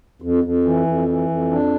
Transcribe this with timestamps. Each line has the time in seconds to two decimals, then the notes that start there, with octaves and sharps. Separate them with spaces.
0.22 F2
0.44 F2
0.65 E3
0.87 F2
1.08 E3
1.29 F2
1.51 D4